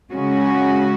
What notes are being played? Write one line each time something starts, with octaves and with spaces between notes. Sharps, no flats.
C#3 G#3 C#4 F#4